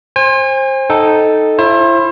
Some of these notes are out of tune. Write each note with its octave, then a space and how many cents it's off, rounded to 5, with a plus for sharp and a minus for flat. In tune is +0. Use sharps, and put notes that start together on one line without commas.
C5 +25 G#5 -35
D#4 +0 A4 +0 G5 -20
E4 +35 C5 +40 E5 +35